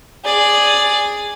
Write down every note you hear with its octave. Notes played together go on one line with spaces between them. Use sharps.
G#4 D5